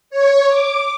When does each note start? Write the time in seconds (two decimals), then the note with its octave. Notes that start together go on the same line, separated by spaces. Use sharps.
0.10 C#5
0.49 D6